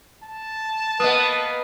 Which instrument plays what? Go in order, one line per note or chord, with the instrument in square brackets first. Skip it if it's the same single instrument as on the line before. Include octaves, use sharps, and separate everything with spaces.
[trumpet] A5
[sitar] A#3 B3 [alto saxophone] B4 [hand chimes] D#5 D#6